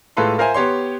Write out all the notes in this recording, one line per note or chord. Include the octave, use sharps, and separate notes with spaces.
A2 G#3 F4 A4 B4 C6
F4 A#4 C5 E5 G#5
B3 G4 C#5 C6